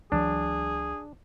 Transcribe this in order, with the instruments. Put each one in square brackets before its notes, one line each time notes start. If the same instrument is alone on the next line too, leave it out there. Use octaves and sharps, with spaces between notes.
[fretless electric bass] C#2 E3 F#3 [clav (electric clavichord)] D4 [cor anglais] G#4